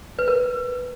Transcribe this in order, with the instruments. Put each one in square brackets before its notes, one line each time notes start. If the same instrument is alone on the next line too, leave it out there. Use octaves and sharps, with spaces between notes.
[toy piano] B4
A#4